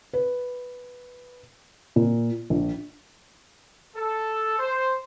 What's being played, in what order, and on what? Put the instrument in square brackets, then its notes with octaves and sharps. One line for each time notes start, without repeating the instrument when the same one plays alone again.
[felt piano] B4
A#2
A#1
[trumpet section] A4
C5